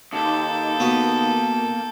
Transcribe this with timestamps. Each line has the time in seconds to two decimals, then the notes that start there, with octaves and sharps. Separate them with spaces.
0.13 D#2 D#4 A4 G5
0.80 A#3 B3 F#4